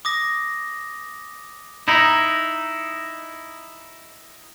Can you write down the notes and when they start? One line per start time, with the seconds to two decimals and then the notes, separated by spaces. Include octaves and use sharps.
0.05 D6 D#6 A#6
1.88 D#4 E4